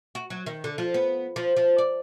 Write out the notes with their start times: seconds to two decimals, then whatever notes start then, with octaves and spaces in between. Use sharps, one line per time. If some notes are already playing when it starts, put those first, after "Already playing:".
0.15 F#4
0.30 F#3
0.46 D#3
0.64 D3
0.78 F3
0.94 B3
1.36 F3
1.57 F3
1.78 D5